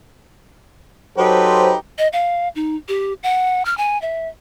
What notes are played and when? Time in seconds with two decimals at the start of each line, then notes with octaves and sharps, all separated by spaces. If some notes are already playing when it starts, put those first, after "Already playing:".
1.18 F#3 D#4 G4 A4 B4 C5
1.98 D#5
2.13 F5
2.56 D#4
2.88 G4
3.23 F#5
3.65 F6
3.78 G#5
4.02 E5